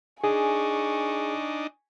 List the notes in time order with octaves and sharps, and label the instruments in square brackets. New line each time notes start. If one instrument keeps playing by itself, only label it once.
[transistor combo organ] D4 D#4 [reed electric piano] G#4 [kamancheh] G#5 C#6